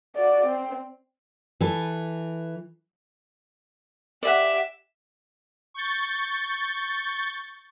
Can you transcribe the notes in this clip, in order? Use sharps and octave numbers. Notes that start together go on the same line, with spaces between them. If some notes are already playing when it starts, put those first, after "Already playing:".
F#4 D5
C4
E3 A4
G4 D5 E5 F#5
C#6 G6 A6